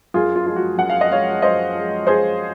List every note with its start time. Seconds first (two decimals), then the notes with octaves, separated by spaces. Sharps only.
0.14 F#2 F4 G#4
0.36 F4
0.46 F3 G#3 F4
0.56 F#4
0.78 F#2 F#5
0.90 F5
1.01 D#5
1.10 F3 G#3 C#5 F5
1.42 F#2 C5 D#5
1.75 F3 G#3
2.07 G#4 C5